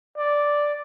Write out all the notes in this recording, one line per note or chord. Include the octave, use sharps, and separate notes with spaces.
D5